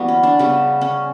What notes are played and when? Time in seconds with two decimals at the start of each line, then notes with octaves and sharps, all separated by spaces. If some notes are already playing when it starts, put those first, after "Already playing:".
Already playing: E3 G3 A#3 B3 F#4
0.08 C#4
0.23 D4
0.39 C#3 G3 B3 C#4
0.81 C#4